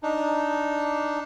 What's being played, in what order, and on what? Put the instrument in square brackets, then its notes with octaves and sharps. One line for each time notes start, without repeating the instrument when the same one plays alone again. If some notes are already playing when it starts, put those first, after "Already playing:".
[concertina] D4 D#4